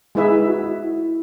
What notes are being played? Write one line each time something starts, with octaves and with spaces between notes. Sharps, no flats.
G#3 D#4 E4 G#4 B4 E5
E4
F#4
F#4
E4